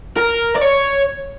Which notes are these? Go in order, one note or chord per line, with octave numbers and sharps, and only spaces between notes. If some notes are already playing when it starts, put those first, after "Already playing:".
A#4
D5
C#5